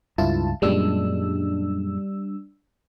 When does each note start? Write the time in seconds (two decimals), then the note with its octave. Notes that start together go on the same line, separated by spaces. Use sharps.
0.18 C#2 G2 E4 F4 A5
0.62 F#2 A#2 G3 G#3 D4 E6